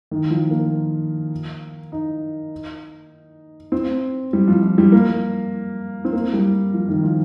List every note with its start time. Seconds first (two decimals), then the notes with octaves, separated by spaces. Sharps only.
0.11 D#3
0.30 F3
0.51 A#3
1.92 D#4
3.72 C4
4.33 G3
4.48 F3
4.62 F3
4.78 G3
4.92 A#3
6.05 C4
6.13 A#3
6.34 G3
6.74 F3
6.88 D#3
7.03 F3